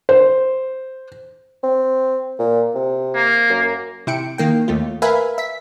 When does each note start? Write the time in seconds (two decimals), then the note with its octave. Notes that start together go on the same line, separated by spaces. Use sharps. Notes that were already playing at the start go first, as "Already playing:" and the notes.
0.09 C5
1.64 C4
2.39 A#2
2.75 C3
3.15 A#3
3.50 F#2
4.07 C3 E4 G5 C#7 D7
4.38 D#3 A#3 G5
4.68 D#2 A3 F4
5.02 A#4 B4 E5 F5 G#5 B5
5.38 E5 B6